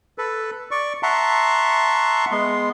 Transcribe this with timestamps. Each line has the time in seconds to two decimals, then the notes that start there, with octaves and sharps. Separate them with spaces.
0.18 A4 B4
0.71 D5 C#6
1.03 E5 F#5 A5 A#5 C6 C#6
2.31 G#3 B3 C6